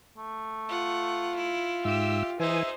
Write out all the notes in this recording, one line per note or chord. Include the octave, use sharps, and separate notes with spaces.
A3
F4 F#5
E4
G#2 G4 E5 E6
E3 D#4 G#4 C5 E5 G#5